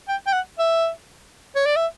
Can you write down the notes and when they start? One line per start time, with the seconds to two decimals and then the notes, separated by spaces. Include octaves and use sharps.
0.08 G5
0.27 G5
0.33 F#5
0.59 E5
1.56 C#5
1.66 D5
1.76 E5